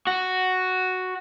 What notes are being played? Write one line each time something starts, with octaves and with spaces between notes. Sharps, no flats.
F#4